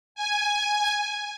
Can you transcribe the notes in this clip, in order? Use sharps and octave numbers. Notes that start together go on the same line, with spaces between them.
G#5